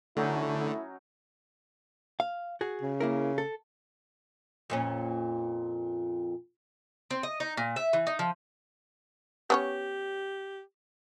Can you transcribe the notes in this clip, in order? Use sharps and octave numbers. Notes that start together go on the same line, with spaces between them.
D3 F#3 A3 C#4 D#4 E4
F5
F#4 G#4
C#3
A#3 E4 A#4
A4
F2 A#2 C#4
C4
D#5
D#4
A#2
E5
E3
D#4
F3
B3 C#4 G4 C#5